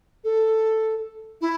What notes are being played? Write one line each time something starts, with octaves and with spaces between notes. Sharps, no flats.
A4
E4